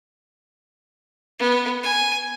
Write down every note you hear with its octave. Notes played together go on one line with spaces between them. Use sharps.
B3
G#5